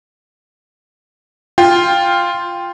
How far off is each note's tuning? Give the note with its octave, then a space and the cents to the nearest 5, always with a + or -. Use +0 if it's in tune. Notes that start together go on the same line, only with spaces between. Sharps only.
F4 +0 G5 +10